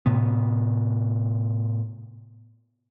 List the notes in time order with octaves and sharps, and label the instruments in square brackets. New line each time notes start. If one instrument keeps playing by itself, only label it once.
[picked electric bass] A2 C3 B3